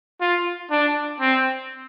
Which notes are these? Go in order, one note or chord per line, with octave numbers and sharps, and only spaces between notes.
F4
D4
C4